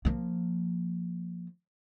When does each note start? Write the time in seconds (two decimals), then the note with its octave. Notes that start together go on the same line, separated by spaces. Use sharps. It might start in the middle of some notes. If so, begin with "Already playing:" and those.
0.05 F3 A#3